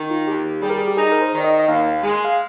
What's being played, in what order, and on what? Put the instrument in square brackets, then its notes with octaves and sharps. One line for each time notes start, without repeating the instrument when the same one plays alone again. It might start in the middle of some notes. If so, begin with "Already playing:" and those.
Already playing: [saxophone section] D#3
[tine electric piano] F4
[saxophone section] D#2 [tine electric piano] G4
[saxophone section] G3 [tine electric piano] G#4
[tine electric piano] A#4
G#4
G4
[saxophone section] D#4 [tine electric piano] G#4
[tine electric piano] A#4
C5
[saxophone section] D#3 [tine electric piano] D5
[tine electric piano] D#5
D#5
[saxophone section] D#2 [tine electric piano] F5
[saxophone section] G#3
[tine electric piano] F5